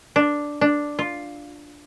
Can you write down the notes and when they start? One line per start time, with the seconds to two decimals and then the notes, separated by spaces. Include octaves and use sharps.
0.16 D4
0.61 D4
0.99 F4